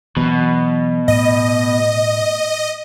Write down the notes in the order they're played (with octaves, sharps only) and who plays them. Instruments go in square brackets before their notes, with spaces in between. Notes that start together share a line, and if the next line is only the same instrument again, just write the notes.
[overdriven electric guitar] B2 [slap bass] E3 F#3
[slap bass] A2 [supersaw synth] D#5